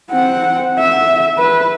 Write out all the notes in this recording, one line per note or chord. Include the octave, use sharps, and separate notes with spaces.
C4 F#5
E5
B4